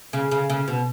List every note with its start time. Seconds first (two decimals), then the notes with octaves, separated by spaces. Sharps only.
0.13 C#3
0.31 C#3
0.50 C#3
0.68 B2